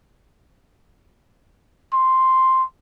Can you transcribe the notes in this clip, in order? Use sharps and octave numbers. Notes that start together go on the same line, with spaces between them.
C6